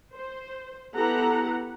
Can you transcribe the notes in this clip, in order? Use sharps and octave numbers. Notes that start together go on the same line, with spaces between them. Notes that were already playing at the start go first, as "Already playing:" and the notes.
C5
B3 E4 G4 A4 F#5 A#5